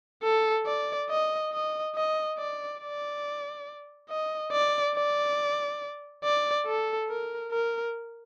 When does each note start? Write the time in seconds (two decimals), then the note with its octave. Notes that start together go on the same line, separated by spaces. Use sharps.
0.23 A4
0.66 D5
1.10 D#5
1.53 D#5
1.96 D#5
2.38 D5
2.80 D5
4.10 D#5
4.53 D5
4.96 D5
6.24 D5
6.67 A4
7.09 A#4
7.52 A#4